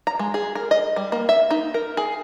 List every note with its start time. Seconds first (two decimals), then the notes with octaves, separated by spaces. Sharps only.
0.07 A#5
0.19 G#3
0.34 G#4
0.55 A#4
0.71 D#5
0.96 G3
1.12 A#3
1.29 E5
1.51 D#4
1.74 A#4
1.97 G#4